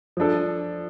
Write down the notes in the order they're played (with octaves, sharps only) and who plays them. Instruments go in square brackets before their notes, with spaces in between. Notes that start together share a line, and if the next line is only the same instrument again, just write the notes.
[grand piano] F3 D4 A4